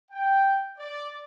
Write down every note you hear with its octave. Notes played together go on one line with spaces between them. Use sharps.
G5
D5